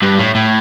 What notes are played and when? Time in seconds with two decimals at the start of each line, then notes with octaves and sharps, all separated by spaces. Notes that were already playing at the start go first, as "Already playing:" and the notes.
0.02 G2
0.19 A2
0.35 A2